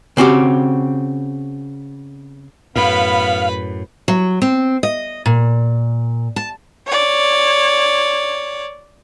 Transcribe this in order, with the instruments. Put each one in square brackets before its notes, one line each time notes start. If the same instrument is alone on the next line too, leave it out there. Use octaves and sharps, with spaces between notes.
[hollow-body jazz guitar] C#3 C4 F#4 G4
[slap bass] F#2 A2 [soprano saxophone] B3 [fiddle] B4 B5 [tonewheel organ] F5
[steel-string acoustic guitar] F#3
C4
D#5
A#2
A5
[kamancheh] C#5 D5